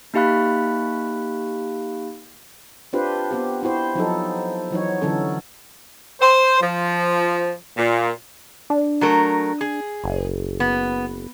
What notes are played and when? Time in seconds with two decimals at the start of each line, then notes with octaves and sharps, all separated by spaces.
0.14 A#3 D#4 G4 F5 B5 F#6
2.93 C4 D4 F4 G4 B4 C5
3.31 B3 C4 G4
3.63 C4 E4 F#4 C5
3.95 F3 F#3 D#4 A4
4.71 E3 F#3 D#4 C#5
5.01 D3 E3 F#3 C#4 A4
6.21 C5
6.61 F3
7.77 A#2
8.70 D4
9.01 F#3 A3 A#4
9.61 G#4
10.04 F#1
10.60 B3